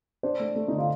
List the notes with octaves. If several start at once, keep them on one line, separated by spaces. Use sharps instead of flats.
D4 C5
A3
A3
D3 D#4
F4